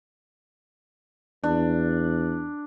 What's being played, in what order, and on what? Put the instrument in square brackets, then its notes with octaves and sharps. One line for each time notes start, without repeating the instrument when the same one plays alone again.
[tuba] E2 [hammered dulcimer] D4